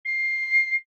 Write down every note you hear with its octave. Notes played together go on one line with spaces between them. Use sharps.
C7